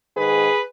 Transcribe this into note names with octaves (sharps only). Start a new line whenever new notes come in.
G#2 D#3 G#4 B4